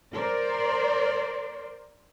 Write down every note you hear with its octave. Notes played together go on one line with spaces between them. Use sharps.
A#4 C5 D5